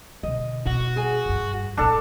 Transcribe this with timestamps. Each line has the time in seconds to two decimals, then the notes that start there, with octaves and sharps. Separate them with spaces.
0.23 B2 D3 D#5
0.67 B2 F#4
0.96 G#4 G#5
1.25 F#1 G2
1.77 A#1 A#2 D4 A4